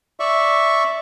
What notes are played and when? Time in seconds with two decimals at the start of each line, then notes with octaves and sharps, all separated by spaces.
0.20 D5 E5 C#6